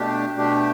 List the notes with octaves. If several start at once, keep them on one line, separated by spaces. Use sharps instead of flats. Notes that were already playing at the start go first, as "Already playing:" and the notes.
Already playing: B2 A3 D4 G4
B2 A3 D4 G4